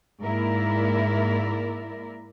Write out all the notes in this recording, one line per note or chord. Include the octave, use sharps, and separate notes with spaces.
G#2 A#3 E4 A#4 D5 E5